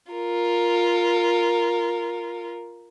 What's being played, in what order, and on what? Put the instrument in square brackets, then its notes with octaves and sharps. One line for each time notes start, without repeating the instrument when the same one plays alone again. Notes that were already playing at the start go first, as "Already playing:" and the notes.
[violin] F4 A#4